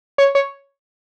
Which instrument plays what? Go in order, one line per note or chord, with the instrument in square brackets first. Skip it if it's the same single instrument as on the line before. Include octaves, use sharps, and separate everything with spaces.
[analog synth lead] C#5
C#5